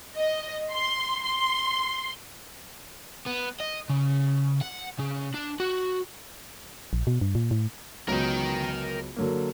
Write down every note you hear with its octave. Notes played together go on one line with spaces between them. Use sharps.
D#5
C6
C6
B3
D#5
C#3
F#5
C#3
D4
F#4
A#1
B2
G2
A#2
A2
C#2 F#3 B3 A#4 G5
D3 F#3 A#3